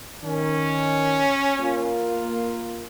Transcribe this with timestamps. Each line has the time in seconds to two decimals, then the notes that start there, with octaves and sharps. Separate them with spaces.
0.24 D#3 C#4
1.59 A#3 F4